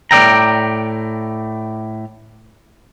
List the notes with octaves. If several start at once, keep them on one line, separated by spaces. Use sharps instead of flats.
A2 D5 E5 G5 A#5